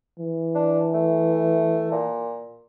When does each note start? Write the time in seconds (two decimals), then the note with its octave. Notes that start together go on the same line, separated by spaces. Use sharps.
0.19 E3
0.55 D4
0.94 A3
1.91 A#2